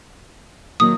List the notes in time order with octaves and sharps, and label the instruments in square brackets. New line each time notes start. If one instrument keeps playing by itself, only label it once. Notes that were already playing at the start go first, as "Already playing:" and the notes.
[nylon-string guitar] D#3 F#3 A#3 [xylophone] D#6